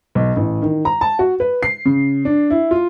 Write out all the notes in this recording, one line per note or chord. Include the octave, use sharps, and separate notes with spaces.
B1
A1
D#3
A#5
A5
F#4
B4
C7
C#3
D4
E4
F4